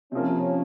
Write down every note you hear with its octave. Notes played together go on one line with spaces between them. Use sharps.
C3 F3 A#3 C#4